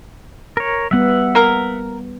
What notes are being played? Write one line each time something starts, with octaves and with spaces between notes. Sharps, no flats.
A#4 C#5
G3 B3 E5 F#5
A#3 A#4